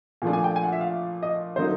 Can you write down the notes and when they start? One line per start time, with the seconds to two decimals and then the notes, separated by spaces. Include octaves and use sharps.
0.22 A#2 F3 A3 D4 G#5
0.33 G#5
0.44 G5
0.56 G#5
0.63 F#5
0.72 E5
0.81 F5
1.23 D#5
1.56 D3 F#3 A#3 D#4 C5